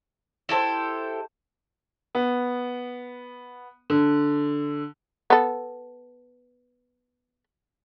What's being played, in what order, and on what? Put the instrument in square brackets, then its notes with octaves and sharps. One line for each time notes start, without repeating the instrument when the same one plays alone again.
[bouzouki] E4 G4 A4 C5
[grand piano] B3
D3
[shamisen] B3 A4